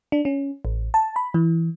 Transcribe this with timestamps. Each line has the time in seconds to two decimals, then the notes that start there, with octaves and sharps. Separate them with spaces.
0.12 D4
0.25 C#4
0.65 A1
0.94 A5
1.16 B5
1.34 E3